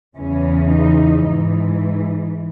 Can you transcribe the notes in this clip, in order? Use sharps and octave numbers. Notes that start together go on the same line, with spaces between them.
E2 C#3 E3 C#4
D#4
G#2 E3